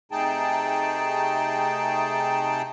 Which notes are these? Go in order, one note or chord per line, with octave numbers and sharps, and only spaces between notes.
C3 A3 D#4 G#4 G5 A5